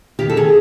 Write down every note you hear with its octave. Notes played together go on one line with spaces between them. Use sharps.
D#3 G4
A4
D#3 G#4